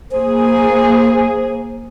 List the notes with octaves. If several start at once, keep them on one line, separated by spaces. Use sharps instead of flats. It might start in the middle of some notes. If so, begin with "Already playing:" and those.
A#3 G#4 C5